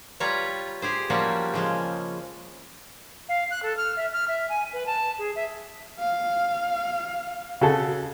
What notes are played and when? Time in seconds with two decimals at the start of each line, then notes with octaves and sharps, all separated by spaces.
0.20 G3 F4 B4 C#5 A#5
0.82 G4 G#4 C5
1.10 F3 G3 A#3 C#4 F#4
1.54 C#3 F3 G#3
3.29 F5
3.51 F#6
3.63 A4
3.77 F6
3.97 E5
4.13 F6
4.28 E5
4.49 G#5
4.73 B4
4.86 A5
5.18 G#4
5.36 E5
5.99 F5
7.61 C#3 F#4 A4